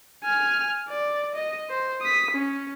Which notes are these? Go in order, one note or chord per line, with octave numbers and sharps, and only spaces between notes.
G#5 F6
D5
D#5
C5
D#6 B6
C#4